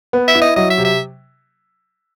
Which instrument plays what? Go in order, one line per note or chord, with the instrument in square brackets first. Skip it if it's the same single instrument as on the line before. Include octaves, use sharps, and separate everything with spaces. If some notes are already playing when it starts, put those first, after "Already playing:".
[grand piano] B3
[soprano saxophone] E5
[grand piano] E4
[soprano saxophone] D#5
[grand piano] F#3 [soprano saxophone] D#5
[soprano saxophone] E5
[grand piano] C3
[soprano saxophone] E5